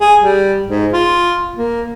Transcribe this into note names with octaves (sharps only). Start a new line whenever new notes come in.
G#4
G3
G#2
F4
A#3